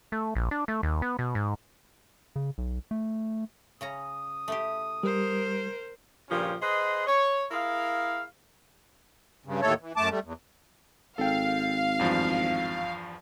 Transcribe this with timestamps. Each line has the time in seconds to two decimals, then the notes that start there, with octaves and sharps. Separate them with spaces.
0.12 A3
0.35 A#1
0.51 D4
0.68 A3
0.83 D#2
1.02 B3
1.19 B2
1.35 G#2
2.36 C#3
2.58 B1
2.91 A3
3.81 C#3 C#4 A#5 D#6
4.48 A3 E4 G4
5.03 G3 A#4 C5
6.30 G2 A#2 C#3 F3 C#4 G5
6.62 G#4 B4 C5 D#5
7.07 C#5
7.51 E4 G#4 A#4 F5
9.45 G2 C#3
9.62 D#2 A2 A3 A4 C#5
9.81 E3
9.97 F#2 A3 A5 D6
10.10 G3 A3
10.24 E2
11.18 G#1 A4 F5 G5
11.99 E2 G2 F3